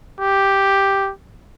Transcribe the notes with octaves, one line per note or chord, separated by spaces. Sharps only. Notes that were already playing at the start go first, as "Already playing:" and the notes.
G4